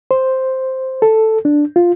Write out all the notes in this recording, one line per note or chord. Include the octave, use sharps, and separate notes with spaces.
C5
A4
D4
F4